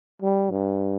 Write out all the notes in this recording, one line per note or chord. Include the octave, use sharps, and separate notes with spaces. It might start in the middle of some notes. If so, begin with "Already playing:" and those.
G3
G2